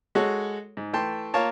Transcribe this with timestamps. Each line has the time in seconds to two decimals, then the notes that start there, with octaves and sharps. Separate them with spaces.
0.15 G#3 F#4 A4 C#5
0.77 G#2
0.93 E3 A3 G5 A5 C6
1.34 A#3 F4 A#4 C#5 A5